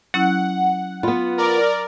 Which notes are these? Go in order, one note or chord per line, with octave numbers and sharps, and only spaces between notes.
F#3 C#4 E4 F#5
B3 F4 B5
A#4 D5